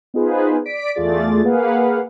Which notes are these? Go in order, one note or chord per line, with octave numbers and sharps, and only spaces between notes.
B3 D#4 F4 G#4 B4 C5
D5 B6 D7
E2 A3 F4 G#4 D5 A6
A#3 G#4 B4 F5 F#5